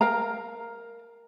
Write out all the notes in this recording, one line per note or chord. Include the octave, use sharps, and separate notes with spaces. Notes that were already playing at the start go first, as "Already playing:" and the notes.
A#4 F5 A#5